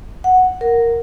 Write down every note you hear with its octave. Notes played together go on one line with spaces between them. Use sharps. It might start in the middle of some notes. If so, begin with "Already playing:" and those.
F#5
A#4